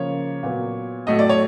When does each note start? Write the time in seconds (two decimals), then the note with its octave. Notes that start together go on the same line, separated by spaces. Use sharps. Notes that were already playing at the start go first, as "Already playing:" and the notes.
Already playing: C#3 F3 A#3 C#5
0.43 A#2 F#3 B3
1.07 A2 F#3 A3 D#5
1.19 D5
1.29 C#5